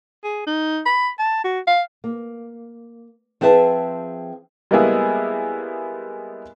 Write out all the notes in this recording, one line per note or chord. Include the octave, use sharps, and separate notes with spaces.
G#4
D#4
B5
A5
F#4
F5
A#3
F3 C4 G#4 B4 E5 A5
G3 G#3 A#3 B3 E4 G#4